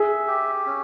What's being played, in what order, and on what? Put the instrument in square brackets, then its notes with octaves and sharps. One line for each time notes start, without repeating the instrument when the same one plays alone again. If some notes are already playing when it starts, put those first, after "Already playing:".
Already playing: [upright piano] G#4 [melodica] E5
[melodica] G4
C#4